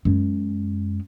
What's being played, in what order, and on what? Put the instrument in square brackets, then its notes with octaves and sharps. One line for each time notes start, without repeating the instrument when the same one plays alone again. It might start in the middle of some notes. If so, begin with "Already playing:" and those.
[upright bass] F#2 G#3